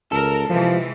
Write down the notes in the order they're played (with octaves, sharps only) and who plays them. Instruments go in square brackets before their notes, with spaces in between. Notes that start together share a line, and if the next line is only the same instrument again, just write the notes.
[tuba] C#2 [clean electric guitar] A4 [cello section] A#4
[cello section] C3 E3 G#3 [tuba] F3